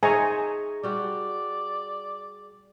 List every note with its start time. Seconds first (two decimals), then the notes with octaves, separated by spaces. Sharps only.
0.03 D#4 G#4 C5 D#5 E5 G#5 A#5 C#6
0.83 G3 F#4 D5